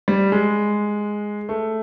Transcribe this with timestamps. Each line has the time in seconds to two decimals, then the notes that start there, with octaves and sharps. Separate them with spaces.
0.08 G3
0.32 G#3
1.49 A3